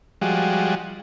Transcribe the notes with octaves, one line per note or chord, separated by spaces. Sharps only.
F3 G3 G#3 F#4